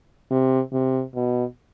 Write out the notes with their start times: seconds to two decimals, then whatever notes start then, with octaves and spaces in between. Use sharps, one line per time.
0.31 C3
0.73 C3
1.15 B2